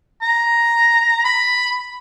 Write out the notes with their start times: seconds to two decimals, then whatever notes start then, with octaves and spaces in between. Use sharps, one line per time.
0.22 A#5
1.25 B5